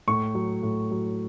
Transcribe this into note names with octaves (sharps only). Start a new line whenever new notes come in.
A2 C#6
F#3
A2
F#3